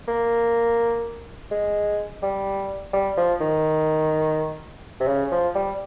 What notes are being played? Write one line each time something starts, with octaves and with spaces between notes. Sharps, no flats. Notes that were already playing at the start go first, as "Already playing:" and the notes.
A#3
G#3
G3
G3
F3
D#3
C3
C#3
F3
G3